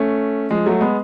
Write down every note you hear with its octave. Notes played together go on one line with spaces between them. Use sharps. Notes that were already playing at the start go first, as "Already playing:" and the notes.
Already playing: A3 C#4
F3 G#3
F#3 A3
G#3 B3